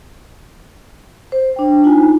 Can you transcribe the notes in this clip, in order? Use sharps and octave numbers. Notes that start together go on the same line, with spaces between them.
C5
D4 G5
D#4 F4 G#5